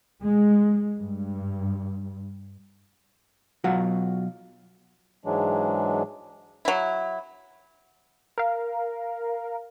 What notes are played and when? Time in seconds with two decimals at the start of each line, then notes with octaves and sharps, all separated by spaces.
0.21 G#3
1.00 G2
3.64 B2 F#3 F4 F#4 F#5
5.25 G#2 E3 F#3 G#3 D4
6.65 F#3 E4
8.38 A#4 F5